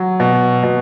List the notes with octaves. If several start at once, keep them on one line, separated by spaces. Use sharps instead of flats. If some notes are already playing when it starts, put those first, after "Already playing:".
Already playing: F#3
B2
B2